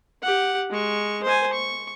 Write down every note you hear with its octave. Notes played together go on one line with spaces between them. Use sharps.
G4 F#5
G#3 C#6
C5 G#5
C#6